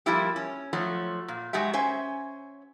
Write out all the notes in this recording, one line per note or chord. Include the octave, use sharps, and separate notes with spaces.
F3 G3 A3 A#3 E4 G4
C#4
F3 F#3 A3
A#2
F#3 G#3 F#4 G4 E5
C#4 C5 E5 G#5